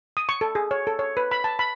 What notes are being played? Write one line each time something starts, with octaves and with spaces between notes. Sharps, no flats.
D#6
C#6
A4
G#4
C#5
A4
C#5
B4
B5
A5
B5